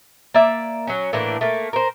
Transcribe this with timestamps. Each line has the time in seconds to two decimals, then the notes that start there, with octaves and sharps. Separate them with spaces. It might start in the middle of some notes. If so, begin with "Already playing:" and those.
0.34 A#3 D5 E5
0.87 F#3 C#4
1.13 A2 E3 A#3 D4
1.41 A3 A#3
1.73 A#4 C5